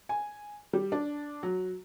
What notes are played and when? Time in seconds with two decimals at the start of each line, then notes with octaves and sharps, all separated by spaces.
0.09 G#5
0.73 G3
0.92 D4
1.43 F#3